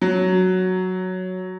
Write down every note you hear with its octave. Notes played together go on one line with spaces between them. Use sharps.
F#3